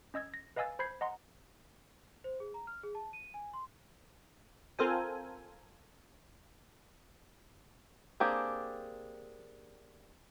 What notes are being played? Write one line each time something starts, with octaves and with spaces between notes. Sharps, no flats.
C#4 D#5 E6 G#6
A#6
B4 D#5 F5 G#5 E6 A6
C5 B5 G6 G#6 C7
D#5 F#5 A#5 C6
C5
G#4
A#5
F6
G#4
A5
D#7
G#5
C6
C4 F4 A4 A#4 C5 G#5
A#3 C4 D4 G4 G#4